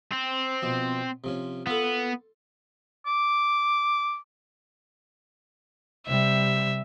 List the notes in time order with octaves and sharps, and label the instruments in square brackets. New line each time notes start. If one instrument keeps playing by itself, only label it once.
[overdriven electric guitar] C4
[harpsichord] B2 F3
C3 F3 C#4
[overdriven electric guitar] B3 [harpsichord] F4 A4
[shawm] D6
[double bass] C3 G3 [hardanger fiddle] E5